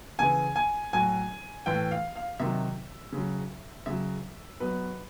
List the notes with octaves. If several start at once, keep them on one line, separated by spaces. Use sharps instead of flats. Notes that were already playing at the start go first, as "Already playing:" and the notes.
C#3 E3 G#5
G#5
A2 F#3 G#5
A2 E3 G5
F5
F5
C3 D#3 F#3 E5
C#3 F#3
C#3 F#3 E5
B2 F#3 B4